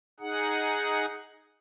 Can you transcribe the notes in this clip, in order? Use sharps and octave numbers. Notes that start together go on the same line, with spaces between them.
D#4 G#4 F#5